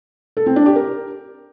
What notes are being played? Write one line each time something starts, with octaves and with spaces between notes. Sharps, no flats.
A4
C4
D4
G4
A#4